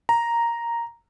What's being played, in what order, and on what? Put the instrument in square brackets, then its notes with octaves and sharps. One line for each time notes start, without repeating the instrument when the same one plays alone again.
[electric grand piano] A#5